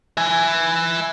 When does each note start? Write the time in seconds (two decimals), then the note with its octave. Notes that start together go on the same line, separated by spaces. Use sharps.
0.17 E5 G#5